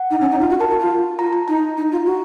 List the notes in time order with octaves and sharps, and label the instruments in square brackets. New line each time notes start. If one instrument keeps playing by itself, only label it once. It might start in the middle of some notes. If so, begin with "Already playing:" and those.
Already playing: [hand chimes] F#5
[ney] D#4
C#4
D#4
F4
F#4
[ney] A#4 [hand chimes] A5
[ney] F#4
F4
[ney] F4 [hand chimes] A#5
[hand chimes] A#5
[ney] D#4 [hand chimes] A#5
[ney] D#4
F4
F#4